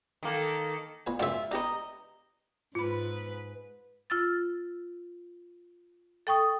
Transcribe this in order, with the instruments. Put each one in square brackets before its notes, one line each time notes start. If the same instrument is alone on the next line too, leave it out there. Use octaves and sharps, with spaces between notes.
[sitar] D#3 A#3 [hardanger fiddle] A4
[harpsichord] A#2 B4 G#5
[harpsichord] C#2 F#2 A#2 [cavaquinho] F4 E5
[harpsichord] D4 G4 B4 [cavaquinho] D#5 A#5
[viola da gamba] G#2 B4 [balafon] F4 B5
[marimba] F4 E6 A6
A4 G5 C#6 D#6